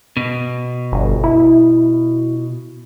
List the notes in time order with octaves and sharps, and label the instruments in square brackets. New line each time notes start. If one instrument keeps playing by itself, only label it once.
[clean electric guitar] B2
[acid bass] G1
E4